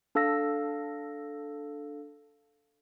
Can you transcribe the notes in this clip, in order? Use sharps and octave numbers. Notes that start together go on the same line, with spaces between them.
D4 A4 F5 E6 A#6